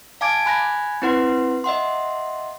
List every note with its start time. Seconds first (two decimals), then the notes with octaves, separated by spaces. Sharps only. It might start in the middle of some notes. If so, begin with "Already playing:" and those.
0.21 F5 G#5 A5 D6 G#6 D7
0.46 G#5 B5 F#6 G#6 A#6
1.02 C4 E4 B4 F#5 C6
1.64 D#5 E5 F#5 C6